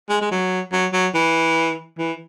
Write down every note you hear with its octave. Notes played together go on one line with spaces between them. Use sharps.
G#3
G#3
F#3
F#3
F#3
E3
E3